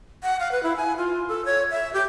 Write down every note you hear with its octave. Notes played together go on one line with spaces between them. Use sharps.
F#5
F5
B4
E4
G#5
F4
A4
C#5
E5
G4